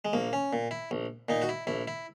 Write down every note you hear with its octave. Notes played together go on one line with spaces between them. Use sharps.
G#3
A#1 A#3
C#4
A#2
E4
A#1
A#2 D#4
F#4
E4
A#1 E4
E4